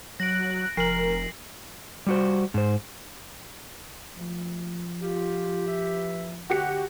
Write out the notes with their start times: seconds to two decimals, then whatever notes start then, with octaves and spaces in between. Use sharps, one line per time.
0.20 F#3 F#6 A#6 D7
0.77 F1 F3 A#4 C7 F#7
2.07 G3 F#4 C5
2.54 G#2 C5
4.18 D2 F3 A3
5.01 F4 G4
5.67 E3 B4 E5
6.50 D3 F#4 G4 F#5 C#7